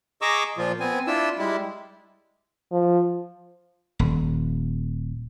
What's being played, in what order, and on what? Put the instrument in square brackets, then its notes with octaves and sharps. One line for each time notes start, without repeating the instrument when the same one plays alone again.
[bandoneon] G#4 D#5 A#5 C#6 D6 E6
A#2 F3 F4
B3 C4 G#5
D4 E4 F4 E6
G3 G#3 E4
[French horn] F3
[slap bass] D#1